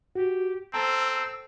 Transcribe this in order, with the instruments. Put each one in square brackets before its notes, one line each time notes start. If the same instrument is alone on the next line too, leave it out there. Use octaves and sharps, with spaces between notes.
[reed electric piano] F#4 [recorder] G4
[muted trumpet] C4 [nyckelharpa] A4 C5 [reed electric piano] A5 A#5 [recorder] E6